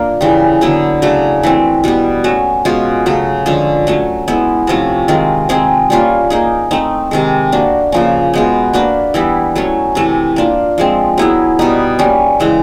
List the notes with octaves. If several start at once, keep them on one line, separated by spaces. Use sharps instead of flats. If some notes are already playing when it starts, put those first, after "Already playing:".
Already playing: A#3 D4 F4 A#4
C#3 E3 G3
D3 F#3 B3 E4
C#3 F#3 A3 D4
E3 A3 C4
B2 G3 B3
A3 C#4 F#4
B2 G#3 C#4 F4
C#3 F#3 A3
D3 F3 G#3 C#4
F#3 A3 C#4
G#3 B3 E4
C3 F3 A3 C#4
D#3 G#3 C4 F4
G#3 C4 D#4 G#4
G3 A#3 C#4 F4
A#3 D#4 G#4
A3 C4 D#4
C3 D#3 G#3
A#3 D4 F#4
C#3 F3 A#3 C#4
B2 G#3 B3
A#3 D4 F#4 B4
E3 G3 B3 E4
F#3 A3 C#4
C3 E3 A3
A#3 D4 F4
F3 G#3 C4
F#3 B3 E4 G#4
B2 G3 B3 D#4
G3 A#3 C#4
C#3 E3 G#3